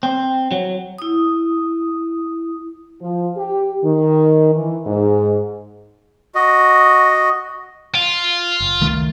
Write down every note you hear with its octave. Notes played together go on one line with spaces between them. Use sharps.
C4
F#3
E4 D#6
F3
G4
D#3
E3
G#2
F#4 D#5
F4
F#1
C#2 D#3 A3